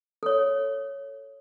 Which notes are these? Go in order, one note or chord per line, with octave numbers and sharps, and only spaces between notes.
A4 C#5